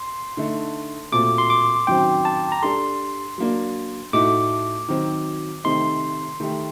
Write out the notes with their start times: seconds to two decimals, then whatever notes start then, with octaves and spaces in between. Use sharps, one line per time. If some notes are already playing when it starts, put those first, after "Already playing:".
Already playing: C6
0.37 D3 A3 D#4
1.12 A#2 A3 C4 F#4 A4 D6
1.38 C6
1.50 D6
1.87 F#2 D#3 F#3 C4 G5
2.25 A5
2.52 A#5
2.62 G3 D4 A4 C6
3.38 F#3 A#3 D4
4.13 A2 A3 D#4 F#4 D6
4.88 D#3 F#3 C4 F#4
5.64 C3 D#3 A3 C4 D#4 C6
6.40 D#3 A3 D#4 G4